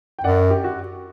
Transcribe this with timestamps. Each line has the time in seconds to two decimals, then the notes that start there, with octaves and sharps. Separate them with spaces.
0.19 G5
0.24 F#2 D5 F#5
0.51 G4
0.64 F#4